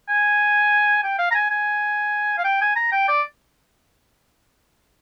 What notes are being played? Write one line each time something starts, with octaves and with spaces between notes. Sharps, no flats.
G#5
G5
F5
A#5
G#5
G#5
F5
G5
G#5
A#5
G5
D5